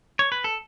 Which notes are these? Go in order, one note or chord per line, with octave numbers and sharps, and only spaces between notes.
C#5
B4
A4